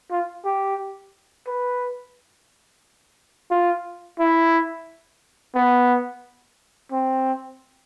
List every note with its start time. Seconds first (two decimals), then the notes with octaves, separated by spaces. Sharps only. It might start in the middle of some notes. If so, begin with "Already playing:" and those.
0.11 F4
0.45 G4
1.47 B4
3.51 F4
4.20 E4
5.55 B3
6.92 C4